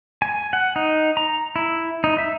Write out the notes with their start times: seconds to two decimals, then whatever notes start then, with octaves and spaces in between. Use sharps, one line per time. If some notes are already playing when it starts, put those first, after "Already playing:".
0.22 G#5
0.53 F#5
0.76 D#4
1.17 A#5
1.56 E4
2.04 D#4
2.18 E5